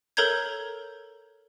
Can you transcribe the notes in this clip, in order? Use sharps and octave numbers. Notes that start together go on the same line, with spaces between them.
A4 A#4 C#5 A#5 G6 G#6